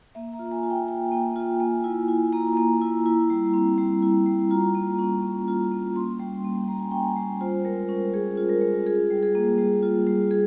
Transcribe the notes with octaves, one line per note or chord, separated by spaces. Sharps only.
A#3 E5
A#5
F4
G#5
F4
G5
A#3 G5
A#3 G5
F4 G5
A#3 G#5
E4
E4
A#3 A#5
A#3
E4
E4
G3
C4
G3
E4
G3
F4 A#5
A#3
C#4
A#3
F4
A#3
C#4 C6
G3
A#3
G3 A#5
G#5
C#4 G5
G#5
G3
F4 C5
G#3 A#4
C#4
G#3 G#4
F4
A#4
G#3
F4 G#4
G3
G#4
A#3
G3
F4
G3
G#4